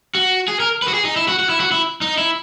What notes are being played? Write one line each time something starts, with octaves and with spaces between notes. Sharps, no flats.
F#4
G#4
A#4
B4
F#4
G#4
D#4
E4
F#4
F#4
E4
F#4
E4
D#4
E4